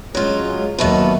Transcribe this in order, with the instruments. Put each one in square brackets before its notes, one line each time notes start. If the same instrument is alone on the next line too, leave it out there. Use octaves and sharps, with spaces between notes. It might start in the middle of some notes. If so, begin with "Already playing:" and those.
[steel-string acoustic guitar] F#3 F4 [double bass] G#3 C#4
[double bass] D#2 F#3 [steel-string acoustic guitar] B2 A3 B3